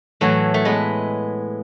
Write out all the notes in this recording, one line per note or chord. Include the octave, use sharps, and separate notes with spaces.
A2 E3 F#3 A3
A3
G#3 B3